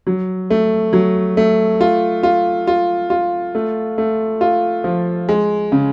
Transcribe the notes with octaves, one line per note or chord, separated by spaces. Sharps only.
F#3
A3
F#3
A3
F4
F4
F4
F4
A3
A3
F4
F3
G#3
C#3